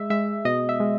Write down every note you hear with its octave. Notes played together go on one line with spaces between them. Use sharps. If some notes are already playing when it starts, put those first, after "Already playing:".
Already playing: G#3 E5
G#3 E5
B2 D#5
E5
G#3